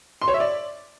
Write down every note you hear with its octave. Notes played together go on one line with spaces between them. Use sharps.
C6
C#5
E5
D5